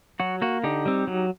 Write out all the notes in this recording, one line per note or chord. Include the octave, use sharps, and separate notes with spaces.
F#3 F#4
A#3 F#4
D3 D#4 G4
G3 C4
F#3